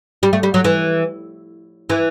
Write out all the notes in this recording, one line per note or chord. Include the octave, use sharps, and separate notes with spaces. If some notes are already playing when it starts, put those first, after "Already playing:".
G3
A3
G3
F#3
E3
E3